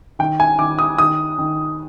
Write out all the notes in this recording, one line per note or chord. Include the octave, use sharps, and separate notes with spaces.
D#3 G5
G#5
D#3 D6
D#6
D#3 D#6
D#3